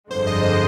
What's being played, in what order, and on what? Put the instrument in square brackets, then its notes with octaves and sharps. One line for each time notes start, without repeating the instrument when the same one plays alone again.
[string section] G1 F2 D3 G#3 [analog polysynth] C5
[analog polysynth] D#5
D#5